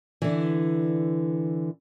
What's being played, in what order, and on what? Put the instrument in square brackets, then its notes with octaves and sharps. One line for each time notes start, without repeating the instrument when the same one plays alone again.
[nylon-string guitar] D3 E3